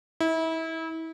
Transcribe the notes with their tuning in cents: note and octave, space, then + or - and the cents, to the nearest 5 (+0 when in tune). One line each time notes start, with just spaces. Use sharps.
E4 -30